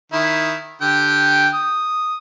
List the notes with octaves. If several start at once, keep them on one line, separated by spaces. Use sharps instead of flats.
D#3 E4
D3 G4 G5
D#6